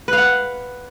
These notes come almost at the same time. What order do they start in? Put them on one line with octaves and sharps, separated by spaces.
B4 F5 F#5